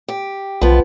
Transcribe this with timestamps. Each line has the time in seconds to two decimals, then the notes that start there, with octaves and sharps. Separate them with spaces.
0.08 G4
0.62 B1 F3 B3